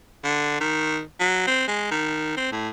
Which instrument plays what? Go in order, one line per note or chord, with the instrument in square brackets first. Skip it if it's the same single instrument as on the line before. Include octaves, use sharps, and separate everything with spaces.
[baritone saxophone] D3
D#3
F#3
C4
G#3
D#3
C4
A2